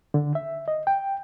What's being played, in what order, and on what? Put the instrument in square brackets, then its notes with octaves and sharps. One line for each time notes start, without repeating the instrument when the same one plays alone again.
[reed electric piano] D3
E5
D#5
G5